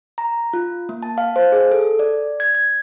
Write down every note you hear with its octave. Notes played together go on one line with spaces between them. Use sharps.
A#5
F4
A#3
A5
F5
C5
G#4
A4
D5
G#6
G#6